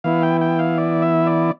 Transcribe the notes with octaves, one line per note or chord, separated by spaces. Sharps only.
E3 B3 E4 F5
G5
G5
F5
D5
E5
D5